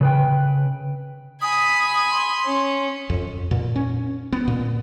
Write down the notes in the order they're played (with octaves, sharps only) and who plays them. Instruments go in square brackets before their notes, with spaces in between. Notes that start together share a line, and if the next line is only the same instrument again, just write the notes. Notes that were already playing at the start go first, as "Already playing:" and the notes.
[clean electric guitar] C#3 B4 G5
[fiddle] G#5 B5 [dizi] D#6
[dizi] C6
[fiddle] C#4
[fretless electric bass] F2
A#2
C#4
B3
A#2